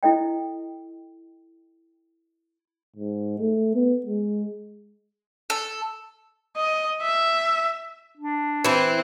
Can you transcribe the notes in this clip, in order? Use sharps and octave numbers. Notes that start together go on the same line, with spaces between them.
E4 A4 D#5 G5
G#2
A3
B3
G#3
A4
D#5
E5
D4
E3 C4 E4